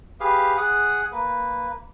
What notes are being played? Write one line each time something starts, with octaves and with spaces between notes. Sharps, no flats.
G4 G#4 B4 F5
G#4 F#5 D#6
A#3 B4